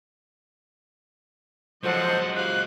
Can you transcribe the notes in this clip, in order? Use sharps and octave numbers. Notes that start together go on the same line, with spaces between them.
F3 F#3 G#3 A4 C5 D#5 F#5
F4 G4 C5 F5 F#6